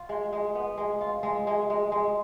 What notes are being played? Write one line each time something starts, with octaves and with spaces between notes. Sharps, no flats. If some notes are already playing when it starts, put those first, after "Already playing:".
Already playing: F4
G#3
G#3
B3
G#3
F4
G#3
G#3
G#3
G#3